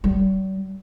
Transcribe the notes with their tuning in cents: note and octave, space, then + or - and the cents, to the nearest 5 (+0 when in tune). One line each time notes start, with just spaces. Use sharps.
G3 -45